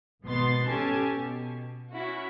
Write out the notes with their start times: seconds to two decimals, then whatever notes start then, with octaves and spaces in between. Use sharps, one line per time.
0.24 G#1 B2 B3 C6 A6
0.67 C#4 G4 A4 G#5 A5
1.12 B2
1.92 C#4 E4 F#4